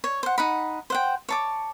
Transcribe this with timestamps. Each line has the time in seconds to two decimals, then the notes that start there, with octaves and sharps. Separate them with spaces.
0.04 C#5
0.23 C5 F#5
0.38 D#4 F#5 B5
0.90 C5 F#5 G5
1.29 C#5 A5 D6